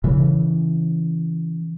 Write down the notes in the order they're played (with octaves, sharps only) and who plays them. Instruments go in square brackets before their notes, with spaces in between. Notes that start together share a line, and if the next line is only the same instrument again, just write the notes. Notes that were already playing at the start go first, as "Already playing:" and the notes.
[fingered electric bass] C#3 E3